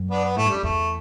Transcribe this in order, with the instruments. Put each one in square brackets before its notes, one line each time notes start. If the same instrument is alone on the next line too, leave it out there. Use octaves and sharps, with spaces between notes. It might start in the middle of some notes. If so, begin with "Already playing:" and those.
Already playing: [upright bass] F#2
[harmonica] B3 D4
B3
[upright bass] A2 [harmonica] A3
[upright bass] G2
[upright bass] F#2 [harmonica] G3
[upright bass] E2 [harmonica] A3